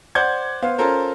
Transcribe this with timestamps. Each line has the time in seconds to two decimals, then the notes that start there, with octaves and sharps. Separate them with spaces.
0.15 C5 D5 F#5 G6 G#6
0.62 B3 C5 F5
0.78 C#4 F4 A4 A#4 C5